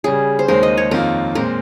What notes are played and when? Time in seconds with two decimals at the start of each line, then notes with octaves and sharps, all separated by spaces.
0.04 C#3 G3 C#4 G#4
0.39 C5
0.48 D#2 D#3 G#3 C#4 A#4
0.63 D#5
0.77 C#5
0.91 F2 D#3 A#3 F4 A#4
1.35 A#2 G#3 C4 A#4